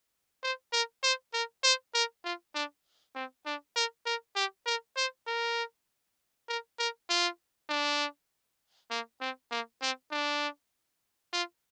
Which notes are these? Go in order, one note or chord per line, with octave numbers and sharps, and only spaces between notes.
C5
A#4
C5
A#4
C5
A#4
F4
D4
C4
D4
A#4
A#4
G4
A#4
C5
A#4
A#4
A#4
F4
D4
A#3
C4
A#3
C4
D4
F4